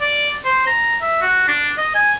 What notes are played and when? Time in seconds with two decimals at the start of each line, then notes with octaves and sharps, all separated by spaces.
0.01 D5
0.45 C5
0.67 A#5
1.02 E5
1.22 F#4
1.48 D4
1.78 D#5
1.95 G#5